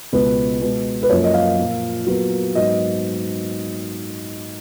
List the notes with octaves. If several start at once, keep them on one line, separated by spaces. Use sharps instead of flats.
C#2 B2 G#3 B3 B4
B2 G#3 B3
B4
F#2 F3 A#3 C#5
D#5
F5
A#2 F3 A#3
A#2 F#3 B3
G#2 F#3 B3 D#5